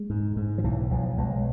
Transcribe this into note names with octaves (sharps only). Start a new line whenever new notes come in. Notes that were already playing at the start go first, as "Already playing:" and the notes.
Already playing: G#3
G#2
G#2
F3
B1 E3
B1 F3
B1 G#3